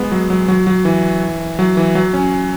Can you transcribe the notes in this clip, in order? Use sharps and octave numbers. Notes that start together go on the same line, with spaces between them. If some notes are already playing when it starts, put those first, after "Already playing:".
Already playing: G#3 B3
F#3
F#3
F#3
F#3
E3
F#3
E3
F#3
C#4